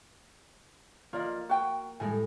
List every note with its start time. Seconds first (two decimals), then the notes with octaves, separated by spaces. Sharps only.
1.13 A#3 F4 D5 D#5
1.49 F#4 G5
2.00 A2 G3 G#3 G#5